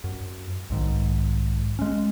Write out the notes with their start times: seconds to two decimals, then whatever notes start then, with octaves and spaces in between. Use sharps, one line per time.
0.04 F#2
0.70 B1 G#2 D#3
1.79 G#3 C#4